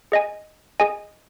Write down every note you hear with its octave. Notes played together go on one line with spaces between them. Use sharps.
G#4 D#5 G#5
G#4 D#5 G#5